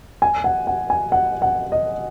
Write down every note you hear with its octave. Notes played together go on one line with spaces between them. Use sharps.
G#5
F#5
F#5
G#5
F#5
F#5
D#5